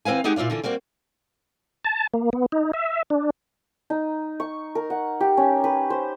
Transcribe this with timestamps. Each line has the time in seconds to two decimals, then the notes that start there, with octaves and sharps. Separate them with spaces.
0.05 E3 C4 B4 F5 G#5
0.24 G#3 D#4 G4 G#4 F#5 G5
0.36 A#2 E4 F4 D5 F5
0.50 D3 E3 F4
0.64 G3 A#3 C4 F#4
1.85 A5
2.14 A#3
2.33 B3
2.52 D#4
2.73 E5
3.10 D4
3.90 D#4
4.40 C#6
4.75 A#4
4.90 F#5
5.21 G4
5.37 C#4
5.64 B4
5.90 C5